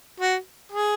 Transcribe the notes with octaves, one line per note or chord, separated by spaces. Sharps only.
F#4
G#4